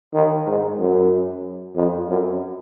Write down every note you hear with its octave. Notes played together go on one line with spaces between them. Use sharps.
D#3
G#2
F#2
F2
F#2